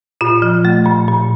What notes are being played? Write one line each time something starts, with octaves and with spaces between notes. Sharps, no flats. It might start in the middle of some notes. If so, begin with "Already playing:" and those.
A#2 F4
F3
A3
A#2
A#2